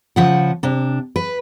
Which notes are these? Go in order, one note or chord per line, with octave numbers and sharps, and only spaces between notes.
C#3 F3 F#5
C3 D4
B4